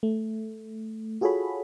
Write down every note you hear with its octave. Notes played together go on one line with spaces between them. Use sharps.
A3
F4 F#4 G#4 A4 C#5 B5